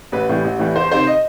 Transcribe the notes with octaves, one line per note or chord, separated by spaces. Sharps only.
A1 B4
A2 E3 G3
A1
A2 E3 G3
E2 C5
C3 D#3 C5
D#5